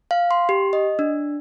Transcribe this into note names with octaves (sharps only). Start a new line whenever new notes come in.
F5
C6
G4
D#5
D4